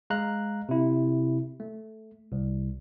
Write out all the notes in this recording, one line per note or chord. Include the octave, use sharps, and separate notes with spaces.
G#3 F5 A#5 F#6
C3 E4
A3
C2